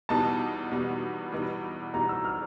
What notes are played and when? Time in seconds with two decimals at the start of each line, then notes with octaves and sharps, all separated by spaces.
0.09 E2 B2 G3 B3 D#4 A5
0.71 E2 B2 G3 B3 D#4
1.32 E2 B2 G3 B3 D#4
1.94 E2 B2 G3 B3 D#4 A#5
2.09 E6
2.25 F6